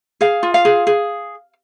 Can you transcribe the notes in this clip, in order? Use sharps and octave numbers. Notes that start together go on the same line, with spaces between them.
G#4 F5
F4
F5
G#4
G#4